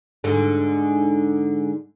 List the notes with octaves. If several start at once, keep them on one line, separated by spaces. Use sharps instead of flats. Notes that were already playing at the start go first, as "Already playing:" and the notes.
G#2 D3